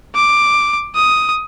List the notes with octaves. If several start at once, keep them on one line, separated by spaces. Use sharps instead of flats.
D6
D#6